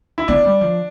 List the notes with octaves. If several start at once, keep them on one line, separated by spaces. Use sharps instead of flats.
E4
B3 D4
G3
F3